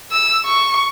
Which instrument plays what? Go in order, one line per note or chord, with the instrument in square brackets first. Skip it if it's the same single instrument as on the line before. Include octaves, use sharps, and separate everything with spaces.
[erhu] E6
C#6